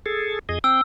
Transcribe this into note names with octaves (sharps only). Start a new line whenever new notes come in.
G#4 A4
F2 G#4 D#5
C4 G5 E6